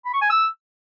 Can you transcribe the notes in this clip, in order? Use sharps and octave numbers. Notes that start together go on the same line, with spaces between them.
B5
C#6
G#5
E6